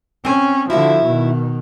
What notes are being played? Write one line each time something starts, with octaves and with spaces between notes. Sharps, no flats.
C4 C#4 G#5
D3 F3 E4 F#4 E5
B2 D#3